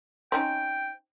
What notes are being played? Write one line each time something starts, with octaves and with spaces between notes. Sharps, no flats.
C4 C#4 D#4 G5